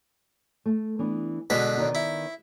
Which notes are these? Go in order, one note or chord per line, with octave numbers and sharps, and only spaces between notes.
A3
E3 B3 D4
B2 D3 G#3 F#4 B4
D#3 B3 D5
E4